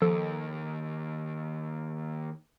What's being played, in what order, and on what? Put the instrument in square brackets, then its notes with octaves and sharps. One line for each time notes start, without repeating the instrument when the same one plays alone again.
[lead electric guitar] D#2 [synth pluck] F3 A4